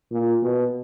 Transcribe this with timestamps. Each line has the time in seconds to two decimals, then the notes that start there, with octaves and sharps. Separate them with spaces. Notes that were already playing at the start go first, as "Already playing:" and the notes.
0.11 A#2
0.43 B2